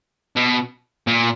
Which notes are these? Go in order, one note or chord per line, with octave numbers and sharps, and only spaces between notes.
B2
A#2